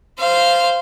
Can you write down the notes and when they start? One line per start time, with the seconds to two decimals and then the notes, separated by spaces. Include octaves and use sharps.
0.20 C5 F5